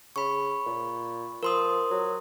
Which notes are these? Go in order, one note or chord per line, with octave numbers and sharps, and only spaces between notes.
C#3 B5 C#6
A#2
F3 A#4 C6 D#6
F#3